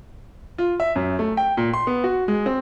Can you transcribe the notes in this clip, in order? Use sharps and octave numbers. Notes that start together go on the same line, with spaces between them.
F4
E5
F#2
A3
G5
A#2
C6
B3
F#4
G#3
C4